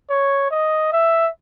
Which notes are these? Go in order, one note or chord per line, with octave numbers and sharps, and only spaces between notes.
C#5
D#5
E5